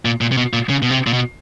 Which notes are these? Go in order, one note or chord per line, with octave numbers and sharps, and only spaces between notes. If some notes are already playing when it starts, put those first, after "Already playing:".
A#2
A#2
C3
B2
A#2
C#3
B2
C3
A#2
B2